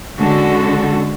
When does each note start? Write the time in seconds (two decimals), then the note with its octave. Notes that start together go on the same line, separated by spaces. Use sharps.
0.18 D3 G#3 C#4 F#4 A4